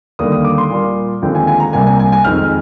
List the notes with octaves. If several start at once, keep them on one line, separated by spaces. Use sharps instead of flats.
D#2 D3 G3 A#3 D#6
D#6
D6
C6
A#2 G3 A#3
D#2 D3 F3 G#3 C4 G5
G#5
G#5
A#5
C2 C3 G3 A#3 G#5
G#5
G#5
G#5
F2 D#3 G#3 C4 F6